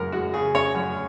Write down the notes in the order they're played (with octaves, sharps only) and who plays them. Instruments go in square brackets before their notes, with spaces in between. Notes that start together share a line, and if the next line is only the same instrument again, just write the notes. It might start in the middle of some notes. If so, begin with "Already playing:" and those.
Already playing: [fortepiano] F#2 C#3 C#4 A#4
G#3 F#4
C#3 G#4
C#4 C#5
F#2